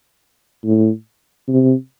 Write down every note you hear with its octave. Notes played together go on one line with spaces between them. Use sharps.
A2
C3